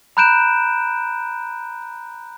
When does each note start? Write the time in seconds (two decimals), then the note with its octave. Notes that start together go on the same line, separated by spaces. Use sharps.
0.17 A#5 B5 F#6 G6 D7 E7